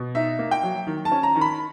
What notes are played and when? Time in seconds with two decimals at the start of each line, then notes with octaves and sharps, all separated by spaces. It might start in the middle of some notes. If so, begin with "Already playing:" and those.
Already playing: B2
0.15 D#4 E5
0.39 A#3
0.51 G5
0.63 F#3
0.87 D#3
1.05 A5
1.12 C#4
1.23 A#5
1.36 D#3
1.41 B5